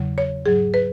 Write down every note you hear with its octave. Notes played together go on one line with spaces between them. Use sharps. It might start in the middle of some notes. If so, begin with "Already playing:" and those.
Already playing: E2 C#3 F#3
C#5
G#2 F#3 G#4
B4